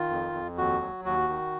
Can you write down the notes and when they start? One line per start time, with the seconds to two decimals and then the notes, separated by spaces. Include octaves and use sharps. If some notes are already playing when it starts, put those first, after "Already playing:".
Already playing: D#3 F4
0.10 F2
0.33 F2
0.58 D#2 F#4
0.81 F#3
1.05 D#2 F#4
1.29 D#3